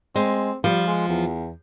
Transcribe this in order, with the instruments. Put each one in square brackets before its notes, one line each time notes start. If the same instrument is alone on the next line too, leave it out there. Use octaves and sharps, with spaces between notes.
[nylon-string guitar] G#3 [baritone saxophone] C4
[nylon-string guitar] F3 [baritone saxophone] G3
[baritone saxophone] G#3
E2